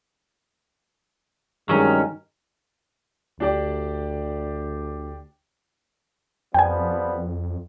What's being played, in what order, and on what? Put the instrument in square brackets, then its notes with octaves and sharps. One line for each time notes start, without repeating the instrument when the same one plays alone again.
[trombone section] G2 D#3 G#3 [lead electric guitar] F#3 C#4
[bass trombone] D2 [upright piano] D4 G4 D5
[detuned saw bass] F2 [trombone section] F3 G3 B3 [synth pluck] G5 G#5